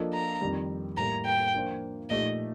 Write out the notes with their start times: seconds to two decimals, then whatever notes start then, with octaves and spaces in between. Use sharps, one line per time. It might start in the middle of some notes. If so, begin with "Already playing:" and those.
Already playing: F3 A#3 D4 A4 D#5
0.14 A#5
0.41 F2 D#3 G3
0.97 A2 G3 A#3 A#5
1.26 G5
1.53 F3 A#3 D4 F4 C5
2.10 A#2 F3 A3 D#4 G4 D#5